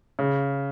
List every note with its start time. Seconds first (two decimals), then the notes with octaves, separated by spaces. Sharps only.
0.19 C#3